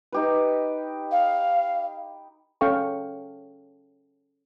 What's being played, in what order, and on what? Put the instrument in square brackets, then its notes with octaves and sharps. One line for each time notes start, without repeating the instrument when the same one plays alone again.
[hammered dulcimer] D#4 G4 B4
[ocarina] F5
[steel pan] C#4 A4 F5 G5 C#6